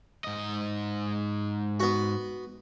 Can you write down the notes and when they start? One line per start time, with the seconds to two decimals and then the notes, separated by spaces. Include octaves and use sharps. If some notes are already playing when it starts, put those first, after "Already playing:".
0.24 G#2 D#5
1.80 B3 F#4